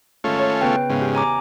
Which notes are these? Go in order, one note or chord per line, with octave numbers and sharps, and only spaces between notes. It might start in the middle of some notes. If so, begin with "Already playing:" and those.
G#2 D#3 A3 C#4 F4 D#5
C#5 G#5 A5
C#3 B3 B4 G5
E2 G#2 C#3 F5
G4
G#5 A#5 D6